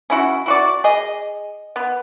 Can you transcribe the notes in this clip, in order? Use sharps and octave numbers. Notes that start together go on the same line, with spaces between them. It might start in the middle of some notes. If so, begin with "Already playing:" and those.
C#4 E4 F#4
E4 F#4 D5
G#4 D#5
B3